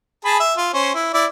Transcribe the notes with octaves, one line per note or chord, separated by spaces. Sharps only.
G#4 A5 B5
E5
F4
C#4 C5
E4
E4 D5